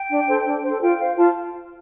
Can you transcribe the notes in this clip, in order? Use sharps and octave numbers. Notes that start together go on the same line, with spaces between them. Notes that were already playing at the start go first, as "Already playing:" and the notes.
Already playing: G5
D4
A4 C5
D4
A4 C5
F4 G5
C5 F5
F4 A5